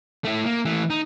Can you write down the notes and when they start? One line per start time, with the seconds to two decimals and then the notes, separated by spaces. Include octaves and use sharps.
0.25 A3 E4
0.46 A#3
0.65 E3 A3
0.90 D#4